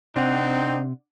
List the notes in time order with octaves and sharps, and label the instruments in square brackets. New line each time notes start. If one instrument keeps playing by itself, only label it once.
[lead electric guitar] C3 [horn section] C4 D#4 [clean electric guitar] D4 F#5